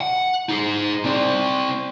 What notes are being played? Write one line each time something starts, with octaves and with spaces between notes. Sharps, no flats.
F#5
D#4 G#4
C4 D5